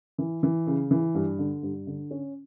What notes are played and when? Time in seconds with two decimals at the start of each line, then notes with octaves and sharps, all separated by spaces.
0.18 E3
0.43 E3
0.67 C#3
0.91 E3
1.15 G2
1.39 D3
1.63 G2
1.87 D3
2.11 C#4